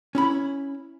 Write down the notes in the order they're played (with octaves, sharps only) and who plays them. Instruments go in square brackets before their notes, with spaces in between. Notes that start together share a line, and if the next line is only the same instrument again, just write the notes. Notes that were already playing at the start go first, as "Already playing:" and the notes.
[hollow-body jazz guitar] C#4 E4 B5